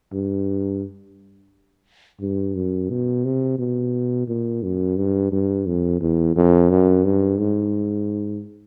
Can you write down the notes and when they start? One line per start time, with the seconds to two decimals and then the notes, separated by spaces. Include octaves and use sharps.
0.13 G2
2.21 G2
2.55 F#2
2.90 B2
3.24 C3
3.59 B2
4.28 A#2
4.63 F#2
4.97 G2
5.32 G2
5.66 F2
6.00 E2
6.36 F2
6.70 F#2
7.04 G2
7.39 G#2